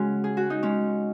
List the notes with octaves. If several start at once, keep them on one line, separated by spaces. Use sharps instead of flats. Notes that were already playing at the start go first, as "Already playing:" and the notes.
Already playing: C#3 G#3 C#4 F#4
G#4
F#4
D#4
G#3 C#4